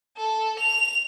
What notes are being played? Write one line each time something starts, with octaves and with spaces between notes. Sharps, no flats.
A4
F7